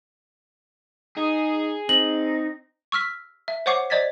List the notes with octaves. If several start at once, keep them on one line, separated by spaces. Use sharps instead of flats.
D#4 G#4
C4 D#4 F#7
C#6 E6 F6 B6
E5
C5 C#5 F#5 C#6 D6 C7
C5 D5 D#5 G#6 A6 B6